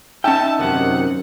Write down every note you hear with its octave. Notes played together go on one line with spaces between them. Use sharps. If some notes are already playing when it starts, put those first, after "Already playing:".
C#4 D#4 E5 G5 A5
F#2 C3 D#3 F#5